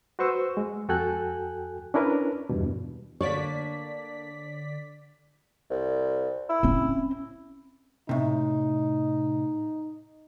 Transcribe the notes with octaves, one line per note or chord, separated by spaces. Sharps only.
F#4 B4 C5 C#6 E6
G#3
F2 F#4 A4 G5 G#5 F#6
C#4 D4 E4 A#4 B4
E2 G2 B2
D3 A#3 D4 C#5 D5 B6
C2
E4
C4 C#4
A2 C3 D#4